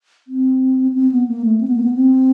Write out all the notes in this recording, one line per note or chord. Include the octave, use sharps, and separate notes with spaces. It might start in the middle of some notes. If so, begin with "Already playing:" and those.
C4
C4
B3
A#3
A3
C4
B3
A#3
B3
C4